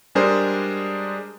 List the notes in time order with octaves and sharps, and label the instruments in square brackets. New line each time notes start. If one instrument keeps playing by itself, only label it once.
[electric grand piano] G3 G#3 D4 G#4 A#4 C5